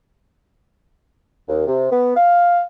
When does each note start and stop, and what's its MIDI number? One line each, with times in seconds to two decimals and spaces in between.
1.49 1.64 39
1.67 1.89 48
1.91 2.16 59
2.17 2.63 77